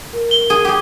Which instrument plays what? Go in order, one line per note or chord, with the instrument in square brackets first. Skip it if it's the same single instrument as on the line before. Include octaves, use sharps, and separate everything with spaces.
[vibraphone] A#4
[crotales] G7
[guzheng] G#4
G4 G#4